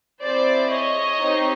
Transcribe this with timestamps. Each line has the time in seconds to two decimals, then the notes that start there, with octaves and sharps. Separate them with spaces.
0.23 C4 E4 G#4 C5 D5
0.71 C#5 D#5
1.18 C4 D#4 G4